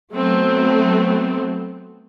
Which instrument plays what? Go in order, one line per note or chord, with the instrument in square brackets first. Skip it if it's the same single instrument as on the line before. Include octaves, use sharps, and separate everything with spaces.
[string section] F#3 A3 B3 C4